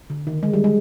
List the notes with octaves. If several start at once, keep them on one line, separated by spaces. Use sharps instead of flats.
D3
D#3
G#3
G3
G#3